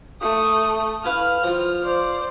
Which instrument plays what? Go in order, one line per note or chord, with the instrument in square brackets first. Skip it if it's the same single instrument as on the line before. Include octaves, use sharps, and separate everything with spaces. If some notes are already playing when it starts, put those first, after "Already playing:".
[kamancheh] A3 D#6
[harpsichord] E4 B4 F5 [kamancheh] F6
[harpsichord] F3 F4
[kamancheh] C5 D5